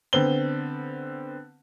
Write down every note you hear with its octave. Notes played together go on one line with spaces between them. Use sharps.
D3 B3 C4 G7